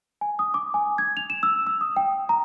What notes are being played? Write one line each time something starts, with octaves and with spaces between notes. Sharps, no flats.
G#5
D#6
D6
G#5
G#6
F7
E7
E6
E6
D#6
G5
A#5